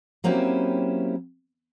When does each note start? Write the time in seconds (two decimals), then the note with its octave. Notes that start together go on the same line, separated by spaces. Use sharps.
0.24 F#3 A#3 C4 C#4 E4 G4